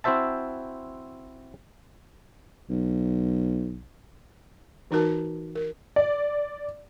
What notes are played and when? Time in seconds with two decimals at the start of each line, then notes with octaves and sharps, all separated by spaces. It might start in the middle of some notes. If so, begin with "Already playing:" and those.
0.04 C4 E4 F#4 C5 E5 A5
2.70 B1
4.91 E3 D#4 F#4 A#4 A5
5.55 A#4
5.96 D5